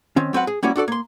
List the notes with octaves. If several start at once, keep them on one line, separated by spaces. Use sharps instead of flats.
D#3 C4 C#4
F#3 C4 B4 F#5
G#4
G3 A#3 C#4 E4 F#4
D4 F#4 A4 D5
A#3 C6